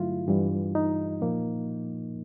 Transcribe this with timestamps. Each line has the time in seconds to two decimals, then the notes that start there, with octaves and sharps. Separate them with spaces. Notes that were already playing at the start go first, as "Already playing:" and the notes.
Already playing: G2 D3 F#3 A3 E4 F4
0.28 G2 E3 G3
0.75 D#4
1.21 A#2 F3 A#3